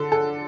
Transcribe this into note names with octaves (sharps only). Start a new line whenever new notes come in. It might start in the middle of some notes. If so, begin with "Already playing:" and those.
Already playing: D3 A4
A4